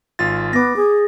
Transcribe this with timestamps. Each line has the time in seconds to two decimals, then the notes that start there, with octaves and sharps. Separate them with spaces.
0.19 G#1 F4 A6
0.53 B3 D6 A#6
0.76 G#4